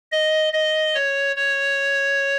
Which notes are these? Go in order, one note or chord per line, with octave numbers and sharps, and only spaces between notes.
D#5
D#5
C#5
C#5